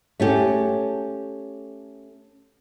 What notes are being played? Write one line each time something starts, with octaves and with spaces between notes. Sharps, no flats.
A3 C#4 G4